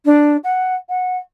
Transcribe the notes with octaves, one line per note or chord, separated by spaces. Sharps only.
D4
F#5
F#5